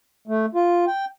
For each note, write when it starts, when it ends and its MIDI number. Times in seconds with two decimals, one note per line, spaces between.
0.28 0.46 57
0.55 0.85 65
0.87 1.05 79